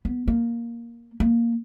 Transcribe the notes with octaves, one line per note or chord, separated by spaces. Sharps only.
B3
A#3
A#3